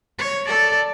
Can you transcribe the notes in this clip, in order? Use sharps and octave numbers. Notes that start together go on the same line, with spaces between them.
C#5
A4 D5